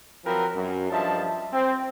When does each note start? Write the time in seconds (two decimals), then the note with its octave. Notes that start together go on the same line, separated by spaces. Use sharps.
0.25 F3 F#3 C4 A#4 B4
0.55 F#2
0.90 G2 F3 D#5 E5 A5
1.52 C4